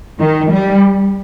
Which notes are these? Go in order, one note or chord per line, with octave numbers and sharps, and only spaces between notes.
D#3
G3